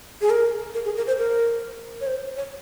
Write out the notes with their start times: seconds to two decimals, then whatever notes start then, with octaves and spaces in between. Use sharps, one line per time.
0.21 G#4
0.30 A#4
0.74 A#4
0.85 G#4
0.97 A#4
1.07 C5
1.18 A#4
2.01 C#5
2.07 C5
2.37 C#5